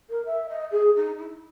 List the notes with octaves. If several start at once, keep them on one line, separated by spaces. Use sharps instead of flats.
A#4
E5
D#5
G#4
D#4
E4